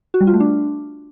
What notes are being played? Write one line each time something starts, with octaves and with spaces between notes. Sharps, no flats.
F#4
G3
F4
A3
D4